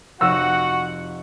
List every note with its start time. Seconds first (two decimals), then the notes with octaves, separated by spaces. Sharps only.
0.21 F1 F#4 F#5 E6 A#6 E7